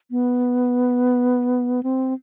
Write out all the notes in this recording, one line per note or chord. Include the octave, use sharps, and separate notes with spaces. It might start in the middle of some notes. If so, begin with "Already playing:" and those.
B3
C4